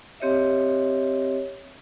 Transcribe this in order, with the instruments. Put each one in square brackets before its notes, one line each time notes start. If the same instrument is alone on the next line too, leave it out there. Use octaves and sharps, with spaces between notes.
[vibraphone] C4 G4 C#5 D#5 E5